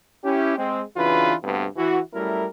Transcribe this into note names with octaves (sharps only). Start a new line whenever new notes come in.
C#4 E4 G4
G#3 C4
C#3 E3 D4 F4 F#4 B4
D2 G2 C3 B3
E3 F#4
F#2 G3 A3 E4 A#4